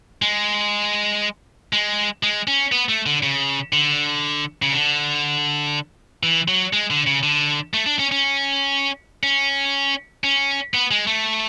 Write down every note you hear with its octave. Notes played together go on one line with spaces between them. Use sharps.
G#3
G#3
G#3
C#4
B3
A3
D3
C#3
D3
C#3
D3
E3
F#3
G#3
D3
C#3
D3
A3
D4
C#4
C#4
C#4
C#4
B3
G#3
A3